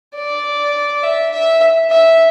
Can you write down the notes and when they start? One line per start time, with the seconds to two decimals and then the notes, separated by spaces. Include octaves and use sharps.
0.15 D5
1.03 E5
1.32 E5
1.90 E5